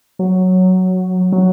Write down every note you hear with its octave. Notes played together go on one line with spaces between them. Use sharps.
F#3
F#3